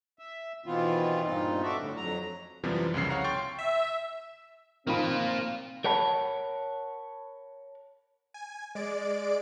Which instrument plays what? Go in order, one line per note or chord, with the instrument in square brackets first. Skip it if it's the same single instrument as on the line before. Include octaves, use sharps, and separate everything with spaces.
[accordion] E5
B2 D#3 E3 B3 C4 F4
G2 A#2 C4 D#4 F4
F#4 A4 D5 E5
A2 D3
F2 F#3 A#5
[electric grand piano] F#2 C3 E3 F3 G3 B3
C2 F2 C#3 C7
C#5 F5 F#5 A#5
G5 C6 C#6 A6
[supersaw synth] E5
[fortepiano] D#3 F3 B5 [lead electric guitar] A#3 F4 [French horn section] C4
[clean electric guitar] A#4 C#5 F#5 A5 B5
[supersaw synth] G#5
G#3 D5 D7